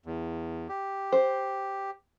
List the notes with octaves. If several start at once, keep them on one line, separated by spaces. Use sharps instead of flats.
E2
G4
C5